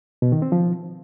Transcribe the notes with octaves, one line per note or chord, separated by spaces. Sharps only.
B2
D#3
C4
F3